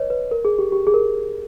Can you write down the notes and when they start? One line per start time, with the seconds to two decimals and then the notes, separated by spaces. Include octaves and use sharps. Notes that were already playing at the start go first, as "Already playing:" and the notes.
Already playing: B4 C#5 D#5
0.10 B4
0.31 A#4
0.45 G#4
0.58 G4
0.72 G4
0.87 G#4
0.94 A#4